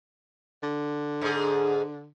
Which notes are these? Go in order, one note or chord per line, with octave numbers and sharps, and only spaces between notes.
D3
G#2 G#4